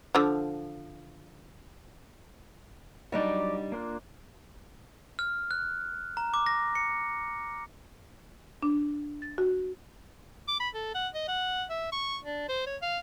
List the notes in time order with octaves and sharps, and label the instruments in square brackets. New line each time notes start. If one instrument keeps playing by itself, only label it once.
[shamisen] D3 F3
[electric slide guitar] F#3 D5 [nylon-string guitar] G3 D4 D#4
[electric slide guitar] A#3 D4 F4
[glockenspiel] F6
F#6
A#5
D6
A#6
C#7
[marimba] D4
A6
F#4
[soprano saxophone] D6
B5
A4
F#5
D#5
F#5
E5
C#6
D4
C5
C#5
F5